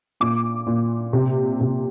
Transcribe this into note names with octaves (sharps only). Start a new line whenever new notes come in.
A#2 D6
A#2
C3
C3